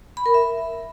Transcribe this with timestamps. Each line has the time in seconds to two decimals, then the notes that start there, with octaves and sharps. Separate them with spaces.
0.17 B5
0.26 A#4
0.34 E5